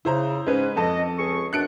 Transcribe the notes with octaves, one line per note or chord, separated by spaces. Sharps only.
C#3 E4 C5 A#5
G#2 G#3 C#4 B4
F2 A4 D#5 A5
C#2 G#4 C#6
F#2 B2 D4 F#6 C#7 D7